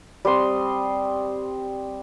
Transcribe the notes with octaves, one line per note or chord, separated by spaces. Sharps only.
G3 C4 C6 D#6